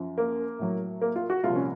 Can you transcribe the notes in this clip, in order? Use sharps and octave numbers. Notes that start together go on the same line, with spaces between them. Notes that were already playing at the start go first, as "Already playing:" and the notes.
Already playing: F#2 F3
A#3
A2 F#3
A#3
F4
F#4
C2 A#2 F3 F4
C#4